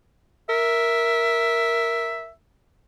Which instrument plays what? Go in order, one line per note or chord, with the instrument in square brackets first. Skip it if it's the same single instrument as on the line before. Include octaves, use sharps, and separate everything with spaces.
[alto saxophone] A#4 [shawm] E5